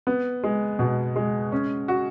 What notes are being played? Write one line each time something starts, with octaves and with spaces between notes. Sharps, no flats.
B3
G#3
B2
G#3
C#4
F#4